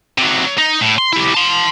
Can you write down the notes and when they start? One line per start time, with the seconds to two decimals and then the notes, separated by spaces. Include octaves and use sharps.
0.18 C3 F#3
0.58 D#4
0.81 A2
0.98 C6
1.13 E4 G4
1.34 A5 C6